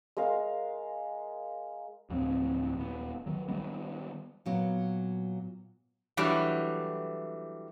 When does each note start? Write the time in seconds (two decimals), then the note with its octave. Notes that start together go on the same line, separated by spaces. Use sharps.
0.17 G#3 A#4 F5
2.10 D2 A2 F3 C4
2.75 D#1 B3
3.26 D#3 F#3
3.48 D#3 G3 B3
4.46 A#2 F#3 B3
6.17 E3 F#3 G3 A3 D4